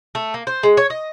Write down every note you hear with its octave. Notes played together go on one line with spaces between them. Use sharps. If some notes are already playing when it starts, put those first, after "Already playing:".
A3
A#3
C5
G#3
C#5
D#5